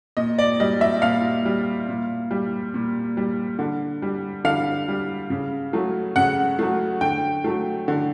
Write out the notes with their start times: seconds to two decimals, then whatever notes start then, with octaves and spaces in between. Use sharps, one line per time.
0.17 A#2 D#5
0.39 D5
0.60 G3 D#5
0.81 E5
1.02 A#2 F5
1.45 G3
1.89 A#2
2.31 G3
2.74 A#2
3.17 G3
3.59 D3
4.02 G3
4.44 D3 F5
4.88 G3
5.30 C#3
5.73 F#3 A3
6.16 C#3 F#5
6.59 F#3 A3
7.01 D3 G5
7.44 F#3 A3
7.88 D3